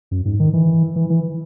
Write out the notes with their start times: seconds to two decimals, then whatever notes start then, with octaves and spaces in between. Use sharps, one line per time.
0.11 F#2
0.25 G#2
0.40 D#3
0.53 E3
0.96 E3
1.10 E3